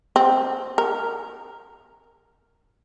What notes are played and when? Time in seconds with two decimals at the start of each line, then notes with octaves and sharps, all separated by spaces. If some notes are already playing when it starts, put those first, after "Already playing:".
0.16 C4
0.78 A#4